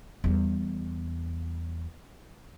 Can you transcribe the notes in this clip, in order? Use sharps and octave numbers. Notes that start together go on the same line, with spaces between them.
E2 G3